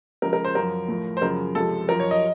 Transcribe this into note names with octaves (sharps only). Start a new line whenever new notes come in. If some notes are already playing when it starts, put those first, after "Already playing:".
C#2 C#3 F3 A#4
A#4
C5
F#2 F3 A#4
A2 F3
C5
F#2 C#3 F3 A#4
C#2 C3 F3 A4
F#2 F3 A#4
C#5
D#5